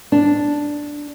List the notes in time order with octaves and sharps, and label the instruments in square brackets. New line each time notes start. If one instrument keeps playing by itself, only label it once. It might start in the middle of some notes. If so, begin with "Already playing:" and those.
[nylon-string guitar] D4